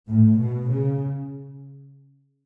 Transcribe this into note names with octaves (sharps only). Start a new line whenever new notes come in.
A2
B2
C#3